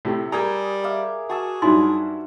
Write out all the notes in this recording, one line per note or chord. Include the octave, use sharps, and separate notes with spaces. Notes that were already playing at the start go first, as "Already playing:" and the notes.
A2 C3 A3
G3 G#4 A#4 G#5 A#5
E5 F5 D6
F#4 G#4 A5 E6
G2 F#3 D#4 E4 C6